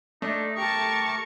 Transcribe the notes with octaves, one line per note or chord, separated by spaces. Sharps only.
A3 D4 D#4
G4 A#4 A5 C#6